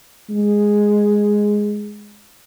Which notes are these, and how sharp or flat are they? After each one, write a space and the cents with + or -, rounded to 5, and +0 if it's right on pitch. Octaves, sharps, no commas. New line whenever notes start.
G#3 +0